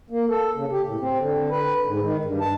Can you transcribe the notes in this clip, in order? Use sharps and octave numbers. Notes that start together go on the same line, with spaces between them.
A#3
A4
C#3
G4
A2
C4
D3
B4
G#2
D#3
G2
A5